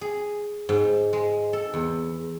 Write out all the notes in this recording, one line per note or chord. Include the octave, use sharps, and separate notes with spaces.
G#4
G#2
G#3
A4
E2